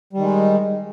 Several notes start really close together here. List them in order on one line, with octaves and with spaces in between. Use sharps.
G3 D#3 G#3